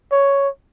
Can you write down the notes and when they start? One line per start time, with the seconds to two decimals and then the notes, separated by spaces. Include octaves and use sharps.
0.12 C#5